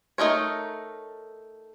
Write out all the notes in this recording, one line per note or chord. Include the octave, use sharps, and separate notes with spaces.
A3 D#4 A#4 C#5